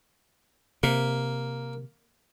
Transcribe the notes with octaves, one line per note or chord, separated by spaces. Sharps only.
C3 A#3